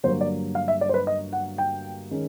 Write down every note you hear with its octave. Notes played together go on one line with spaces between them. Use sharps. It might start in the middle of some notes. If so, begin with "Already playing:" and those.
G1 G2 D3 F#3 A#3 C5
D5
F5
E5
D5
C5
B4
D#5
F#5
G5
D#3 G#3 C#4